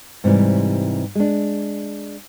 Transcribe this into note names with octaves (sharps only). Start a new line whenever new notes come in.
G#2 C3 E3 G3
G#3 D4